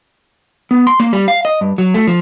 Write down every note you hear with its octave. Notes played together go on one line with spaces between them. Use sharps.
B3
C6
A#3
G3
F5
D#5
G2
F#3
A3
F3